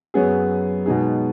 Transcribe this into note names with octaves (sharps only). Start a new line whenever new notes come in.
F#2 F#3 B3 G#4
B2 G#3 B3 D#4 G#4